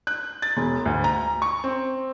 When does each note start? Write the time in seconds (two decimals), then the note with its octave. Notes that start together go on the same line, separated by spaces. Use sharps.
0.07 F#6
0.42 A6
0.57 E1
0.86 D2
1.04 A#5
1.42 C#6
1.64 C4